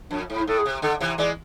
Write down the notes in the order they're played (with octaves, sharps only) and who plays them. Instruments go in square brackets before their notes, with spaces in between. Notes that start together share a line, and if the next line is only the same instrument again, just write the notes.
[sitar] F2 [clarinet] D4
[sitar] G#2
[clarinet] E4
[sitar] A2 [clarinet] A4
[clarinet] G#4
[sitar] C3
[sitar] D3 [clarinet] A4
[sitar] C3 E3
[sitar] E3 G#3 [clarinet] D5